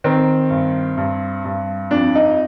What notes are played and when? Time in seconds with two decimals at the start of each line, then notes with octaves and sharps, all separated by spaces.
0.04 D#3 C4
0.50 G2
0.97 G2
1.45 G2
1.91 F2 D4
2.15 D#4